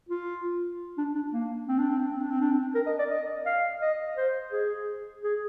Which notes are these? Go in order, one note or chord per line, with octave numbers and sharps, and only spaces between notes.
F4
D4
D4
A#3
C4
D4
C4
D4
C4
D4
C4
D4
C4
A#4
D#5
D5
D#5
F5
D#5
C5
G#4
G#4